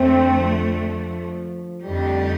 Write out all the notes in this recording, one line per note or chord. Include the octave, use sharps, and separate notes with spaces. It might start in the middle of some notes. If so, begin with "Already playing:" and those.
Already playing: F2 D3 A3 C4
F3
F2 D3 G3 A3 D#4 G4